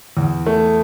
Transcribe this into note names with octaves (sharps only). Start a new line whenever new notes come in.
E2
A3